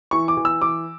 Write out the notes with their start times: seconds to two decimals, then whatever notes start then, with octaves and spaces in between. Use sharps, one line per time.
0.11 E3 C#6
0.28 D6
0.37 E3
0.45 E6
0.62 E3 D6